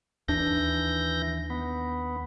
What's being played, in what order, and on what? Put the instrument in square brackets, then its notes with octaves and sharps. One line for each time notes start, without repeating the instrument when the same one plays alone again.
[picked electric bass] D#2 D4 [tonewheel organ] E3 G6 A#6
[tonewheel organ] B3